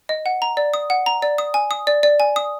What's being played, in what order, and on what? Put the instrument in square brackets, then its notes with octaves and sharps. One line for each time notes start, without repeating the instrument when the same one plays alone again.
[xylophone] D#5
F#5
A#5
D5
D#6
F#5
A#5
D5
D#6
G#5
D#6
D5
D5
G#5
D#6